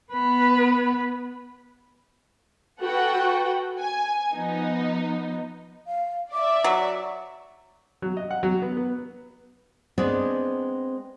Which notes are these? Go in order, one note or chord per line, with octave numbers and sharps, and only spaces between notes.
B3 B4
F#4 A4 B4 F#5 G5
G#5
F3 B3 D#4
F5
D5 E5 D6
F#3
F#3
D#5
F#5
F#3
B3
B3
G#3 B3 C4 D4 G#4 D5